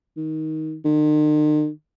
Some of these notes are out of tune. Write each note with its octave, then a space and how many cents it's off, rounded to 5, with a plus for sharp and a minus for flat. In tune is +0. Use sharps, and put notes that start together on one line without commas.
D#3 +15
D#3 -45